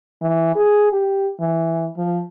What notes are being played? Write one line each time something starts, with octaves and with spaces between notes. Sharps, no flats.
E3
G#4
G4
E3
F3